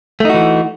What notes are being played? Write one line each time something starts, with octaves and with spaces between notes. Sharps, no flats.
E3 A3 D#4 F#4